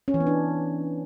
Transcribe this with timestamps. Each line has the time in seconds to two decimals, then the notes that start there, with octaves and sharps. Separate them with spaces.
0.08 C#4
0.14 E3
0.20 B3
0.27 D4